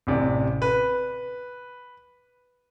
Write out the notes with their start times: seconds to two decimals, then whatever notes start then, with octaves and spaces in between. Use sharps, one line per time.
0.07 A1 C3 D5
0.62 B4